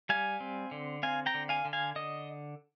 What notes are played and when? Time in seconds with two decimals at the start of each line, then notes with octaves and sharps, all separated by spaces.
0.09 G3 F5 G#5
0.40 C4
0.71 D3
1.03 C4 F5 G#5
1.26 G5 A#5
1.34 D3
1.49 F5 G#5
1.65 D3
1.73 F5 G#5
1.96 D3 D#5